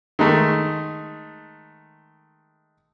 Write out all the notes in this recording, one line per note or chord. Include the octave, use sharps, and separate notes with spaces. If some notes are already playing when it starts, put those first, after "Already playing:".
D#3 G#3 A3